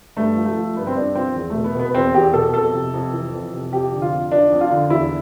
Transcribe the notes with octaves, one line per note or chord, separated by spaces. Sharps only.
G2 A3
F3
A3
F3
G2 B3
C4
G2 D4
F3 C4
E2
B2 A3
B3
B2 B3
B3
E2 C4
E2 G4
B2 A4
F2 A4
C3
F2
E3
F2
C3
F2 G4
D3
F4
F2
F3 D4
F2
F4
D3
E2 E4